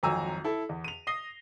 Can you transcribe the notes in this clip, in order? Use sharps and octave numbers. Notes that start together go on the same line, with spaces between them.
G#1 F2 F#3 G#5 A#5 E6
E4 A4
E2
D#7 F7
D#6 A#6 C7 G7